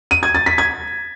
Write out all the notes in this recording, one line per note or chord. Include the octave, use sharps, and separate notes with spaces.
D#7
G#6
A6
B6
G#6